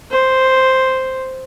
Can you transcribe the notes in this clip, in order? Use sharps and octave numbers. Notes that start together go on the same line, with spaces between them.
C5